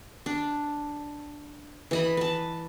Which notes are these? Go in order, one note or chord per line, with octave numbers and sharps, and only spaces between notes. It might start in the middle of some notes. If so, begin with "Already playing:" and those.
D4
E3 D#5 B5
B4 A5